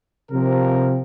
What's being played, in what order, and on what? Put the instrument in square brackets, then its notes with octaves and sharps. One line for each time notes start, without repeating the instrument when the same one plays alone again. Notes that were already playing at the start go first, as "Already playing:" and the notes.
[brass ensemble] C3 F3 C4 A#4